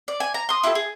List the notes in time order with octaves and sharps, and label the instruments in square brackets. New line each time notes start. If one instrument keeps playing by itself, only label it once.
[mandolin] D5
G#5
A#5
C6 D#6
E4 F4 G4 A4
G#4